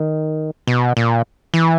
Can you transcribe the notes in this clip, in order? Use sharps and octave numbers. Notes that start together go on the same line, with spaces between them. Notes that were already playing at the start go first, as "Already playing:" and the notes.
Already playing: D#3
B2
A#2
E3